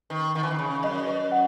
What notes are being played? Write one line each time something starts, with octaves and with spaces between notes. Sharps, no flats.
D#3 B4
D#3 F#5
E3
D#3
C#3 B5
F#2 D#5
B4
F#5